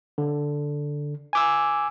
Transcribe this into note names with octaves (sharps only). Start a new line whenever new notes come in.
D3
G#5 D6 E6